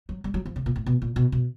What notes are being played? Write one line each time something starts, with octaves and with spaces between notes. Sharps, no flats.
F#3
G3
F#3
F3
C#3
A#2
A2
B2
A#2
B2
B2